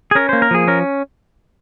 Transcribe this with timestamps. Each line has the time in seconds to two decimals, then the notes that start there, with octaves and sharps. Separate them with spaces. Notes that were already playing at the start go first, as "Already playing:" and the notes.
0.11 G#4
0.15 C#4 A#4
0.29 A#3 C5
0.42 A#4
0.51 F3 G#4
0.67 C#4 A#4